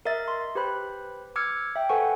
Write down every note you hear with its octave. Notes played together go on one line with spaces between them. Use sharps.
A#4 D#5 E5 A6
C6
G4 B4 C5 B5 F#6
D6 E6 F6 G#6 C#7
E5 G5
A4 B4 C5 F#5 G#5 C#6